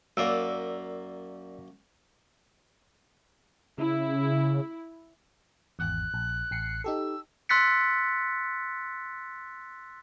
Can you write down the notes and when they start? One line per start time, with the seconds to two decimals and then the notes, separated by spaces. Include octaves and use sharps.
0.17 F#2 A#3 D5 E6
3.78 C#3 E4
5.79 G#1 E2 F#6
6.14 A#1
6.51 A1 C7 C#7
6.84 D#4 G4 A4 E6
7.49 C6 E6 F#6 A6 B6 C#7